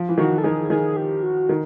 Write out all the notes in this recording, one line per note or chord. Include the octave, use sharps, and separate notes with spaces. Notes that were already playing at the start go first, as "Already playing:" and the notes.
Already playing: F3
E3
D#3 F#4
A4
D#3 G#4
D#3 G#4
G4
F#4
D#3